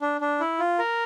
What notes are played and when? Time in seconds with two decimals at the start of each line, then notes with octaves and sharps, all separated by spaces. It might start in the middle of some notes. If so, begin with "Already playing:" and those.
0.01 D4
0.21 D4
0.40 E4
0.59 F4
0.79 A#4